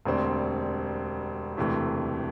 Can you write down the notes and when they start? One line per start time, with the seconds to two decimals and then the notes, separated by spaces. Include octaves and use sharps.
0.05 E1 D2 D3 G3 C4
1.57 E1 D2 C3 E3 A3